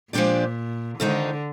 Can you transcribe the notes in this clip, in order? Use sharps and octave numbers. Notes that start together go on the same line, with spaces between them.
A#2 F3 G#3 D4 G4 D5
F2 D3 D#3 G#3 D#4